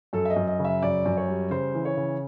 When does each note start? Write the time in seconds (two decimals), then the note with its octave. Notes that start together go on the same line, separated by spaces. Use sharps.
0.13 F#2 A4
0.25 E5
0.30 D#5
0.36 F#2
0.47 D#5
0.59 C#3
0.64 E5
0.82 F#2 D5
1.05 F#2
1.17 C#5
1.28 G3
1.50 C#3 C5
1.74 E3
1.85 C#5
1.97 C#3